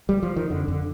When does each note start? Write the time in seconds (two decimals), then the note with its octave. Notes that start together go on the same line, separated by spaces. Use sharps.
0.09 G3
0.23 F3
0.36 D#3
0.50 F2 D3
0.68 F2 D3